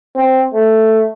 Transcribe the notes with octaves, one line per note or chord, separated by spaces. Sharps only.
C4
A3